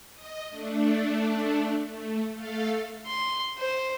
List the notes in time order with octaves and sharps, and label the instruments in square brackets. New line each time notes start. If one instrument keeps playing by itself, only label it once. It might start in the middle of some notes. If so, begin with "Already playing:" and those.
[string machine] D#5
A3 D4
A3
A3 A4 F5
[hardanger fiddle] C6
C5